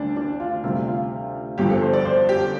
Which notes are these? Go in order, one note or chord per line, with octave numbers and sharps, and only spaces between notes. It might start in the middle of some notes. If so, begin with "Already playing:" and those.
Already playing: D2 D3 G3 D4
D4
F4
D2 C3 G3 F4
F4
G1 G2 F3 G4
A4
C5
D5
C5
G4